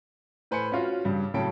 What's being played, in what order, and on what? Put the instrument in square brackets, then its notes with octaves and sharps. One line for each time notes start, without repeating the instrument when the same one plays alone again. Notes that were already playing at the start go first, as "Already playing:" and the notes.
[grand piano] A2 B4 C5 G#5 C#7
C#4 F4 F#4
G2 C#3 G3
A2 C#3 F#3 G5 A5 D7